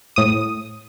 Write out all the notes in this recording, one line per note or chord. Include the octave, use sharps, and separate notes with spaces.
A2 D#6